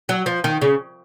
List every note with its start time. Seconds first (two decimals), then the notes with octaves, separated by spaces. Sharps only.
0.09 F#3
0.26 F3
0.44 D#3
0.61 C#3